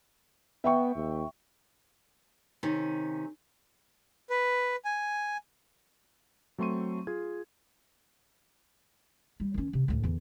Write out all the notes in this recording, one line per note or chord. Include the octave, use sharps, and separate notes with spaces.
B3 E5 G5 C#6
D#2
C3 D#3 C#4
B4
G#5
F#3 A3 C4 C6 C#6 D#7
F4 G#4 G#6
G3
D#3 C#4
C3
D2 A2
E2 D3